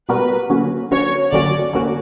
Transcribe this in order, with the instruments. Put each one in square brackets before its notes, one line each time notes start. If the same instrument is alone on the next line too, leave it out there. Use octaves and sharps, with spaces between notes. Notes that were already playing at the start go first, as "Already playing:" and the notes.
[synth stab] B2 G3 B3 F#4 A#4 [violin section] B4
[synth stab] D3 F#3 A#3 C#4 F#4
[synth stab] D3 F#3 A#3 C#4 F#4 [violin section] C#5
[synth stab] D3 F#3 A#3 C#4 F#4 [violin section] D5
[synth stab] D3 F#3 A#3 C#4 F#4